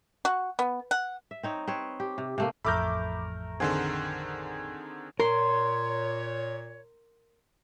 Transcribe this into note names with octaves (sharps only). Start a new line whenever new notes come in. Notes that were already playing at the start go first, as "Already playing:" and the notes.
F#4
B3
F#5
E5
C4 D#4 C#5
C4 B4 C#5
G4
C3
C3 A3 A#3
A1 F2 A3 A#4 B5 D6 G6
D3 D#3 C4 G#4 F#5 C6
A#2 A#4 C#5 C6